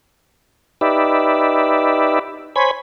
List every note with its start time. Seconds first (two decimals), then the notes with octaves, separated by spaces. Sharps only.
0.81 D#4 G4 B4 D5 E5
2.56 C5 C#5 G#5 B5